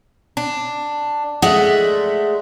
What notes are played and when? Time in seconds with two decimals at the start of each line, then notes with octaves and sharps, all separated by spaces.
0.37 D4
1.42 G#3 A3 D5 E5 F#5